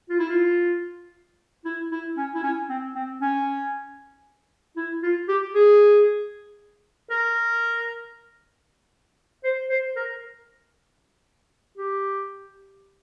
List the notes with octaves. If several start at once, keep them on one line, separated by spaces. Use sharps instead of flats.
F4
E4
F4
E4
E4
C#4
E4
C#4
C4
C4
C#4
E4
F4
G4
G#4
A#4
C5
C5
A#4
G4